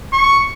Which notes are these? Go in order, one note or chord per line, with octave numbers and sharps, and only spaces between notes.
C#6